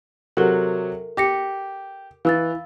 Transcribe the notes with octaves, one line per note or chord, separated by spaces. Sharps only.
C3 F#3 F#4 A4 A#4
G4 D6 A#6 C#7
E3 F5 E6 A6